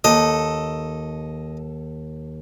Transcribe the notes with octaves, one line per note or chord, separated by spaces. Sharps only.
D#2 A4 D#5